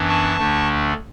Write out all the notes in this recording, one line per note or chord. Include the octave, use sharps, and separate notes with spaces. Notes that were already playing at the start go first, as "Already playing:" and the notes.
Already playing: F#2 E3 B3 D4
A5 C#6
D2 D3 A3 D4